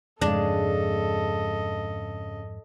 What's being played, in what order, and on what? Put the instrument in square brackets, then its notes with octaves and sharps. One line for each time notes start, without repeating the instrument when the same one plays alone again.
[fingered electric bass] F2 G#2 [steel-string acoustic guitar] C#3 G#3 [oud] D4 [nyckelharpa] A4 D#5